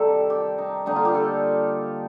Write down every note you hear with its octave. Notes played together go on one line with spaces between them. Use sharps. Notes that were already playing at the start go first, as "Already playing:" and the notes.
Already playing: C3 D#3 G3 G4 A4
G4
D#4
D3 G3 A#3 D#4
F4
G4
A4